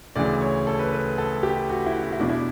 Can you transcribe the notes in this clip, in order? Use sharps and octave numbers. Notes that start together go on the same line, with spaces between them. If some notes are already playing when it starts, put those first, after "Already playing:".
D2 C#3 E3 D5
C#5
A4
B4
B4
A4
G4
F#4
E4
F#4
E4
E2 B2 D4
E4